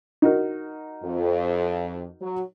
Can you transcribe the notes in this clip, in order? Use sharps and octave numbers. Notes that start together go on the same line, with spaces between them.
D#4 F#4 A#4
F2
F#3